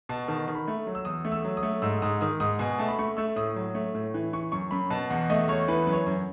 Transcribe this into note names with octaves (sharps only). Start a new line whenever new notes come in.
B2 A5
D#3 A5
D#3
B5
A3
F#3
E6
E2 D#6
A3
E6
F#3
D#6
A3
G#2 E6
G#2 D#6
D#3 D#6
G#2 D#6
B2 G#5
A3 A5
B5
A3 C#6
A3 E6
A2 D#6
F#3
A3
A2
E3
E3 C#6
F#2 C#6
F#2 B5
B2 A5
E2 F#5
A3 D#5
E2 C#5
E3 B4
F#2 B4
C#5
F#2